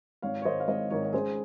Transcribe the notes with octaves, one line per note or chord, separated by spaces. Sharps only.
G#1 C#5 F5
C#5
G#2 D#3 C5 D#5
F5
G#1 C5 D#5
G#2 D#3 A#4 C#5
C#5
C#2 G#4 C5